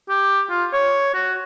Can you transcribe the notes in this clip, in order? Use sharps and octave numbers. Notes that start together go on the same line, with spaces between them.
G4
F4
C#5
F#4